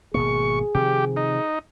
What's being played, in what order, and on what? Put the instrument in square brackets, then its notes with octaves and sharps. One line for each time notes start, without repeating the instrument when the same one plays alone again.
[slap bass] G#1 B2 A#3 [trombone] G#4 [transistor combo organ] C#6
[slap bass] C3 D#3 F3 [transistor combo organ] G4
[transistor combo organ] D#4